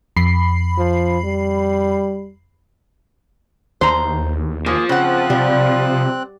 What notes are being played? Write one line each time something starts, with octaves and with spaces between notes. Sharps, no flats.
F2 B5 C7
F3
G3
D#2 C5 A#5
F3 A#3 G#4
C#3 C4 F#5 F#6
C3 G3